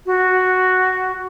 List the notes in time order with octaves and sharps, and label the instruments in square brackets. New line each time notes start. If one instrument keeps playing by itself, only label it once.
[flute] F#4